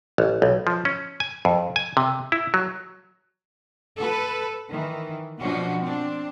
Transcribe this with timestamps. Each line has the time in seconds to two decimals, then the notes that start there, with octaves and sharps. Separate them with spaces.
0.18 A1
0.42 B1
0.67 F3
0.85 C#4
1.20 G#5
1.45 F2
1.76 G#5
1.97 C3
2.32 E4
2.54 F#3
3.98 A4 B4
4.69 D#3 E3
5.40 B2 F3 C#4 D4 F#4
5.81 C4 D4